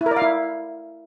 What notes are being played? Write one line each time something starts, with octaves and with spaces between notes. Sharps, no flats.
E4
A#4
D5
F5
E4